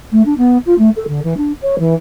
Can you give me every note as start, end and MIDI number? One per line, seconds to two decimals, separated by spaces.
0.12 0.22 57
0.25 0.34 62
0.37 0.57 59
0.65 0.76 65
0.78 0.89 57
0.96 1.04 69
1.07 1.22 50
1.23 1.36 52
1.37 1.52 62
1.61 1.78 73
1.78 1.94 52